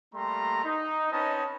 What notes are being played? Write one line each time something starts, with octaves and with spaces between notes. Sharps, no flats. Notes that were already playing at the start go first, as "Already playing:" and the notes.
G3 A3 A#3 A#5 C6
D#4
C4 C#4 D#4 B4 D#5 A5